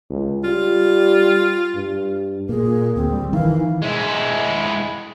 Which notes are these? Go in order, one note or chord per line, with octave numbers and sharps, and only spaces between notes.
C#2
G3 F4
G2
A#2 A#3 G#4
D2 C4
G3
D#3 E3 F5
G#3 E4